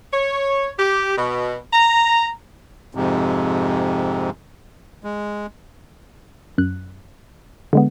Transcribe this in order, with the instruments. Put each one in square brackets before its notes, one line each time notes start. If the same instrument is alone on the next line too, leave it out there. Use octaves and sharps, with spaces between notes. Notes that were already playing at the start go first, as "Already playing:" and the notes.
[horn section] C#5
G4
B2
A#5
[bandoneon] F2 G#2 C3
G#3
[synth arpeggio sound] F#2 F#6
D3 G#3 B3